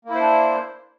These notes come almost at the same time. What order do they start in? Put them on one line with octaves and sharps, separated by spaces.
A#3 E4 C5 D4